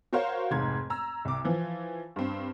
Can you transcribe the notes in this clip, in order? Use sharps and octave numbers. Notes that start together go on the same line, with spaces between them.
F#4 A#4 C5 C#5 F5
F1 G#2 G#6
A#5 E6
C2 D6
E3 F3
G2 C4